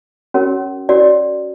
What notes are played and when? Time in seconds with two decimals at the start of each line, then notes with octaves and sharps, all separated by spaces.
0.34 C#4 F#4 A#4 C#5
0.89 C#4 F#4 A#4 C#5 D5